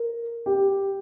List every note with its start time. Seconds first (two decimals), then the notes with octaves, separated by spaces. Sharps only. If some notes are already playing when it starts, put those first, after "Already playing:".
Already playing: A#4
0.46 G4